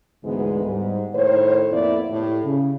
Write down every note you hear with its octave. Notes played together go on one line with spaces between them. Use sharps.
D2 G#2 D3 E3 G#3 B3
G#2 G3
A2 D#3 C5 C#5
F2 A2 A#3 B3 E4 D5
A2 G4
C#3